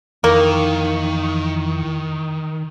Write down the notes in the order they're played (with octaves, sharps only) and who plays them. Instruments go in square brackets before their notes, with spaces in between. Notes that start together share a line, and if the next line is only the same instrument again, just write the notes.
[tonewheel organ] F2 E3 C#6 [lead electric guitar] D#3 [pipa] A#3